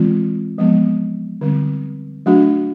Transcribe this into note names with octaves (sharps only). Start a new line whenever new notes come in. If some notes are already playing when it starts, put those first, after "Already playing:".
Already playing: E3 G#3 C4 F4
F3 G#3 B3
D3 G3 C4
F#3 A3 D4 F#4